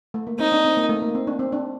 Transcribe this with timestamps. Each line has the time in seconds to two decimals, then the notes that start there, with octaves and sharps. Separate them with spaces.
0.14 A3
0.27 A#3
0.39 C4 D#4
0.52 D4
0.65 C4
0.77 A#3
0.89 A3
1.02 A#3
1.15 C4
1.27 D4
1.39 C4
1.52 D4